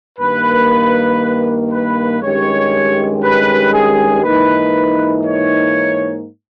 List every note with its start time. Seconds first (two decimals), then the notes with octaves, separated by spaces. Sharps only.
0.19 G2 D#3 A#3 B4
1.71 B4
2.22 G2 D#3 G#3 C#4 G4 C#5
3.23 B4
3.73 G#4
4.23 G#2 E3 A#3 D#4 B4
5.25 C#5